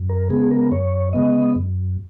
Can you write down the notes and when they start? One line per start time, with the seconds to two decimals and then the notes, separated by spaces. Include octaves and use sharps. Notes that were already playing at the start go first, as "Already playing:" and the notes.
Already playing: F#2
0.09 A#4
0.29 C#3 G#3 B3 G#4
0.51 A#4
0.72 F#2 C#5
1.13 C#3 G#3 B3 D#5
1.55 F#2